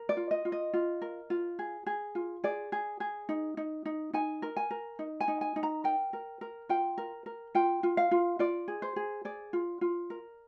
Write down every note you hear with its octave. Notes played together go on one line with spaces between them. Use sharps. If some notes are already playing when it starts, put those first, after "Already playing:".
Already playing: A#4
D5
F4
D#5
F4
D#5
F4
A#4
F4
G#4
G#4
F4
G#4 D5
G#4
G#4
D#4
D#4
D#4
D#4 G#5
A#4
G#5
A#4
D#4
G#5
D#4
G#5
D#4
A#5
A#4 G5
A#4
A#4
F4 G5
A#4
A#4
F4 G5
F4
F5
F4
F4 D5
G#4
C5
G#4
G#4 D5
F4
F4
A#4